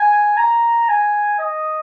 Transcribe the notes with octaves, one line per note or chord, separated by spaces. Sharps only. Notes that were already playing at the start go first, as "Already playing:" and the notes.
Already playing: G#5
A#5
G#5
D#5